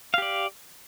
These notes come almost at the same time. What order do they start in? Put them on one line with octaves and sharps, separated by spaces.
F5 G4 D5